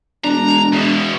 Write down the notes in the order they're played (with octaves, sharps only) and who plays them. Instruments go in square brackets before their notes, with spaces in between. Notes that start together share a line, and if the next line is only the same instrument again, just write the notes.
[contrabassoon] E1 [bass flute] G#3 [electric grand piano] D4 [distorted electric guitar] A#5
[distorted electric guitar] E2 B2